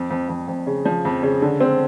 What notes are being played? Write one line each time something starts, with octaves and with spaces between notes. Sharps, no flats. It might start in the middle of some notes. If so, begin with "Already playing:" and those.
Already playing: F2
F2
F2
F2
C#3
F3
F2
C#3
D3
C4